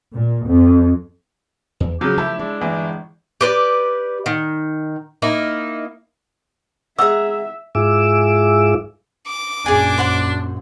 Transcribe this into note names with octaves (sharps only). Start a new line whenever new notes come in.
A#2
F2
E2
C#3 F3 F#3 G4
F3 A3 E4 A5
G#3 D4
G1 E3
G4 B4 D5
D#3
A#3 D#4 E4
G#3 G#4 E5 F#5 A#5 E6
G#2 E4 F4 G#4 D6 E6
D6
A#1 F#2 D4 G#4 G#5
C5 F#5 C6